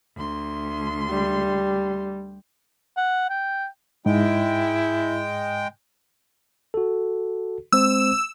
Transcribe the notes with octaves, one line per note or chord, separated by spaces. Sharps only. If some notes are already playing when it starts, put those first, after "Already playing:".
D2 C6
G3
F#5
G5
G#2 G#3 E4 G5
F#4 A4
G#3 C4 C5 E6